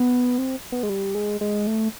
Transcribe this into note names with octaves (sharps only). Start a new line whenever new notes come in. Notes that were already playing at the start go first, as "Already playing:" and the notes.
Already playing: B3
C4
B3
G#3
G3
G#3
G#3
A3